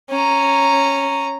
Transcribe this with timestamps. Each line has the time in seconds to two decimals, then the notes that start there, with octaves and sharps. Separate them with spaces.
0.11 C#4 A#5